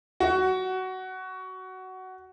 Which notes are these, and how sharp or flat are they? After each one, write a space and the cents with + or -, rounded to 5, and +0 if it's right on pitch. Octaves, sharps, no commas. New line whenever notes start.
F#4 +15